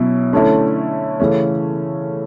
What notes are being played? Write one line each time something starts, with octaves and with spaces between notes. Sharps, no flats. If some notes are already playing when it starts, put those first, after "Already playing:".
Already playing: B2 F#3 C#4 E4
D3 A3 C#4 E4
C#3 E3 A3 C#4